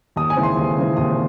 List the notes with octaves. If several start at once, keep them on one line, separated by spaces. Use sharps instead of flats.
D#2 D#6
G#5
C#3 E3 G#3 C4
C6
D#2
C#3 E3 G#3 C4
D#2 D#6